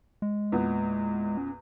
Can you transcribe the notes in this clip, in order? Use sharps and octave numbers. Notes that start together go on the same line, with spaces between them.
G#3
E2 A#2 B3
C#4